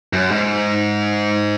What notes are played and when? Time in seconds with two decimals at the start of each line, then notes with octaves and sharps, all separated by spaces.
0.13 F#2
0.31 G#2